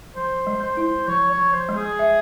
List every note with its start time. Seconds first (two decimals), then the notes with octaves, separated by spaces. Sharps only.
0.16 F3 C5
0.47 G#3
0.62 C5
0.77 E4
1.07 F3 C#5
1.31 C#5
1.38 F3
1.53 C5
1.69 G#3
1.76 G#4
1.99 E5